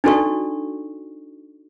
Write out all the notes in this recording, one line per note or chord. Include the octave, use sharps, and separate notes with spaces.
D4 D#4 F#4 A4 D5 C#6